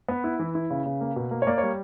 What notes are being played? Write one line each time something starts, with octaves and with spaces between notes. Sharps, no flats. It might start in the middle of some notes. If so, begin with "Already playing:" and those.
B3 B4
E4
E3
E4
C#3
C#3
A#3
B2
A#3
C#5
A#3 D5
G3 C#5